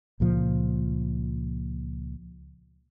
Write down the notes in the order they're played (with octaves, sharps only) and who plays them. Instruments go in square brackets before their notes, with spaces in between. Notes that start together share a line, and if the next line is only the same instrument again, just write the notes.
[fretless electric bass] C#2 A#2 F3